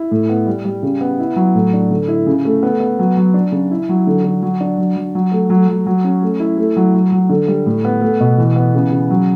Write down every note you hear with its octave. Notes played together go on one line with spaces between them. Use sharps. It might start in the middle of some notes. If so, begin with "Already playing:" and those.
Already playing: E4
A2
B3
G3
G3
C#3
B3
E4
F#3
A2
D4
D3
E4
C#3
A3
B3
B3
F#3
F#3
D4
C#3
E4
F#3
D3
D3
F#3
D4
F#3
F#3
F#3
A3
F#3
F#3
F#3
C#4
A3
E4
A3
F#3
F#3
F#3
D3
G3
A2
B3
A3
B2
E3
B3
C#3
C#3
F#3